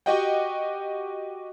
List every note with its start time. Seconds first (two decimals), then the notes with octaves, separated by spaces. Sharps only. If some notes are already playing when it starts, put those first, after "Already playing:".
0.06 F#4 G4 D#5 F#5 G5